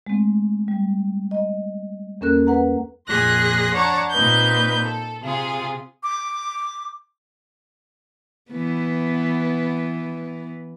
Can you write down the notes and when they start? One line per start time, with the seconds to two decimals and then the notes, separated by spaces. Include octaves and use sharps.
0.07 G#3 A3 C4
0.68 G3
1.31 D#5
2.21 E2 A#3 C#4 A4 A#4 F#6
2.47 B4 F#5 A#5
3.08 F2 A#2 G#4 C6 F#6 A#6
3.72 D4 C#5 F#5 A5 A#5
4.10 A#2 A#3 C4 D#4 B4 G6
4.84 A4
5.21 C3 F4 G#4
6.03 D6
8.51 E3 B3